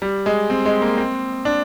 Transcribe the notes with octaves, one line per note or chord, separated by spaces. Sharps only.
G3
G#3
C4
G#3
A#3
C4
D4